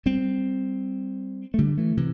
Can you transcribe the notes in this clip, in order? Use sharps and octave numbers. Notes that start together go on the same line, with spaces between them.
G3 C4
A3
D3 G3
E3 A3
C3 E3